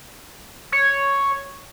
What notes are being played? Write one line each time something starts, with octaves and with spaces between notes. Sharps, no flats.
C#5